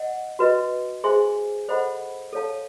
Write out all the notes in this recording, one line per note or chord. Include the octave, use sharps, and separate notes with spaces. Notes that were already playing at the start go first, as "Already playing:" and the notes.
Already playing: D#5 F#5
F#4 B4 D#5
G#4 C5 E5 G#5 C6
A4 C5 D#5 F#5 B5
A4 C#5 F5 A5